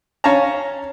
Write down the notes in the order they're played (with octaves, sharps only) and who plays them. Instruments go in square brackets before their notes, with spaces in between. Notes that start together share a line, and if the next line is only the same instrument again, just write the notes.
[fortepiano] C#4 C#5 F5 A5 A#5